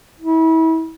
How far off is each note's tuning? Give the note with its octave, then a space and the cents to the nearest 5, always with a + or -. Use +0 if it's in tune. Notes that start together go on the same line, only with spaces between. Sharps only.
E4 -35